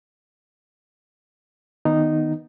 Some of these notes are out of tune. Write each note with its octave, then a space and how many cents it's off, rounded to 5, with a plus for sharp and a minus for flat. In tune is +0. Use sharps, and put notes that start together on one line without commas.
D#3 +0 B3 +0 D#4 -5